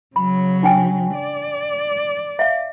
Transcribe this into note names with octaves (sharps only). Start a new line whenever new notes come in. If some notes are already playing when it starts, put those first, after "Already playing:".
C#3 F#3 B5
D4 G5 G#5
D5
E5 F5